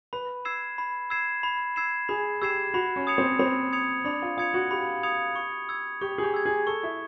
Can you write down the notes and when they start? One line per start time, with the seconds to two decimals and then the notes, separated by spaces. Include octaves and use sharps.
0.13 B4 B5
0.45 E6 G#6 C7 E7
0.78 B5
1.10 E6 G#6 C7 E7
1.43 B5
1.76 E6 G#6 C7 E7
2.09 G#4 B5
2.42 G4 E6 G#6 C7 E7
2.74 F#4 B5
2.96 C#4
3.07 D#6 G#6 C#7 F7
3.18 C4
3.39 C4 B5
3.73 D#6 G#6 C#7 F7
4.05 D4 B5
4.22 F4
4.37 F4 D#6 G#6 C#7 F7
4.54 F#4
4.71 G4 B5
5.03 D#6 G#6 C#7 F7
5.36 C#6
5.69 E6 G#6
6.01 G4 C#6
6.18 G#4
6.23 G4
6.34 E6 G#6
6.46 G#4
6.67 A4 C#6
6.83 E4